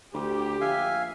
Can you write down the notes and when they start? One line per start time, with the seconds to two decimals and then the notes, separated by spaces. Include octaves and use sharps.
0.14 D2 G4
0.61 A#1 E5 F5 G#5